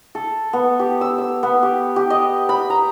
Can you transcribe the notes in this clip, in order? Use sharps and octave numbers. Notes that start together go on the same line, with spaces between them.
A4
B3
G4
E6
E6
B3
G4
G4
D#5
B5
A#5